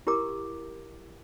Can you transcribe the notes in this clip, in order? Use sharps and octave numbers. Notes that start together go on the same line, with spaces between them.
E4 G4 A#4 A#5 D6